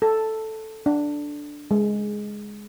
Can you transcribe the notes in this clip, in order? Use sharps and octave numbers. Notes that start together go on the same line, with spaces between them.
A4
D4
G#3